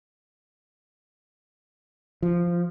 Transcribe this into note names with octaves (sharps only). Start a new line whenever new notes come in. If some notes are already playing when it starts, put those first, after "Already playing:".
F3